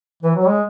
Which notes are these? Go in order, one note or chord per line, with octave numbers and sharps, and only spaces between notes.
E3 B4
F#3
C#5
G#3